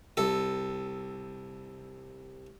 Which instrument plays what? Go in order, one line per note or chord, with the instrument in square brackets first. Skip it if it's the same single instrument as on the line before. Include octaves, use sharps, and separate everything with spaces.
[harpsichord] C2 A4